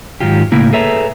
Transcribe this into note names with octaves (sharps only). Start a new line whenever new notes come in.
G#2 D#3 F#3 F4 G4
A2 C#3 A#3 E4
G#4 A4 B4 C#5 E5 A#5